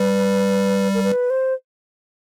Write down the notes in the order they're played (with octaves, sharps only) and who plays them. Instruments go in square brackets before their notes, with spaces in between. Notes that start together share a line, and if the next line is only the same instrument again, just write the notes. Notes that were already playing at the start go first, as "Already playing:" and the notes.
Already playing: [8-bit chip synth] G3 [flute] B4
[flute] A#4
B4
C5